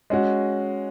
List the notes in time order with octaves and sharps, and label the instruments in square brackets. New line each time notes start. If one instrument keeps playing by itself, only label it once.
[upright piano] G#3 C#4 F#4